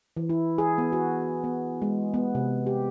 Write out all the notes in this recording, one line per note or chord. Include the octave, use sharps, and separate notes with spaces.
E3
E4
G#4
B3
F#4
B3
G#3
B3
C3
G4